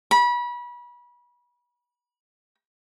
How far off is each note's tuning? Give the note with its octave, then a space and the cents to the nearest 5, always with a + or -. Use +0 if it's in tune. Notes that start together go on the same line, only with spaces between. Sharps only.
B5 -30